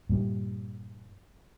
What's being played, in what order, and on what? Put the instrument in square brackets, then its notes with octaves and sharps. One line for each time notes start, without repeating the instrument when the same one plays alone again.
[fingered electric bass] G2 A#2 G3